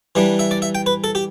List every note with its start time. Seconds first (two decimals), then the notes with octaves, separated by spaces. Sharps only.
0.15 E3 G3 D4
0.39 E5
0.51 D5
0.62 E5
0.75 G5
0.86 B4
1.04 A4
1.15 G4